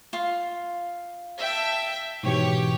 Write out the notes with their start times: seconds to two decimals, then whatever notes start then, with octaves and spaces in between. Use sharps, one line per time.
0.13 F4 F5
1.39 E5 G5 A5
2.23 G#2 B2 E3 G4 C#5